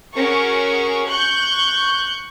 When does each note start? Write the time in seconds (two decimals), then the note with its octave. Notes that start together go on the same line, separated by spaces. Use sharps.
0.15 C#4 F#4 G#4 A#4 C#6
1.08 C#6 F#6 G6